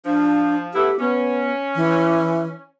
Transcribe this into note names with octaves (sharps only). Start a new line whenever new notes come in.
F3 D4
A3 B3 E4 G4
B3 C#4
E3